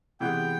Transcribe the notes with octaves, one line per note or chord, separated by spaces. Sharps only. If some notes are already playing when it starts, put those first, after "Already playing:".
C3 E3 G#3 B3 G5